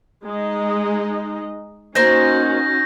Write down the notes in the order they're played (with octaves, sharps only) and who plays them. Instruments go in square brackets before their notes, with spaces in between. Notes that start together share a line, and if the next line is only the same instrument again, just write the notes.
[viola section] G#3 D#4 D#5
[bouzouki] A#3 C5 D#5 [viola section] C#4 D#4 F#4 [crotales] G6 A#6